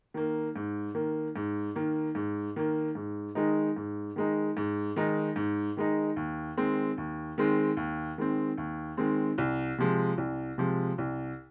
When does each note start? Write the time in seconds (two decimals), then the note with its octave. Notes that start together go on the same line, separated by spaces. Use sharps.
0.14 D#3 A#3
0.56 G#2
0.95 D#3 A#3
1.36 G#2
1.75 D#3 A#3
2.15 G#2
2.56 D#3 A#3
2.95 G#2
3.35 D#3 G#3 D#4
3.76 G#2
4.16 D#3 G#3 D#4
4.57 G#2
4.96 D#3 G#3 D#4
5.36 G#2
5.77 D#3 G#3 D#4
6.16 D#2
6.57 D#3 G#3 C4
6.98 D#2
7.38 D#3 G#3 C4
7.77 D#2
8.18 D#3 G#3 C4
8.57 D#2
8.97 D#3 G#3 C4
9.38 C2
9.78 C3 F3 G#3
10.18 C2
10.58 C3 F3 G#3
10.98 C2